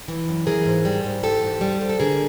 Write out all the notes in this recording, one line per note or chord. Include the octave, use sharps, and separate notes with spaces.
E3
F#2
E3 G#4 A#4
G#2
G3
G#2
E3 G4 A4
G#2
G3
G#2
A4
D3 G#4 A#4